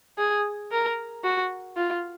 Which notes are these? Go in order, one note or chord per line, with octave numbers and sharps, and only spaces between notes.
G#4
A#4
F#4
F4